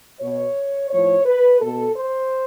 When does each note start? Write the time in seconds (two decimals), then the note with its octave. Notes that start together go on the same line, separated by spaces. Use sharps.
0.21 B2 C#5
0.90 A2 F3 C#5
1.26 B4
1.60 B2 A4
1.96 C5